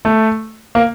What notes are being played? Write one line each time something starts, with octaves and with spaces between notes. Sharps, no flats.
A3
A#3